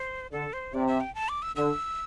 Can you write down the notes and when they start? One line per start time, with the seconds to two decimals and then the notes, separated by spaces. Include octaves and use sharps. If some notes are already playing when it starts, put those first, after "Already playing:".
Already playing: C5
0.31 D3 A4
0.53 C5
0.74 C3 D5
0.87 E5
1.00 G5
1.15 A5
1.29 D6
1.42 E6
1.56 D3 E6